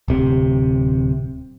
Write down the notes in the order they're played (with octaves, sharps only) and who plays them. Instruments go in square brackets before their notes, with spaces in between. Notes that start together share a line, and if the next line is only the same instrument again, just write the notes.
[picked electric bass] D1 C3